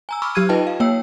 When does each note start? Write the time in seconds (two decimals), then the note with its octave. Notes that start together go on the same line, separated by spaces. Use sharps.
0.09 G#5 A#5 E6
0.22 B5 C#6 D6 E6 F6
0.35 F#3 G4 E6 F6 G#6 D#7
0.49 D#4 F4 B4 D#5 G5 A5
0.67 F5
0.80 A#3 C#5 G5 E6